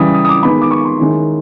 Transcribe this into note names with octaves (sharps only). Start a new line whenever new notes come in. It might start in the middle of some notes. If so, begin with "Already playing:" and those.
Already playing: C#3 E3 G3 D#6
D#6
D#6
D6
D#3 G#3 B3 D#4 B5
D6
C#6
C6
D#3 G#3 C#4 E4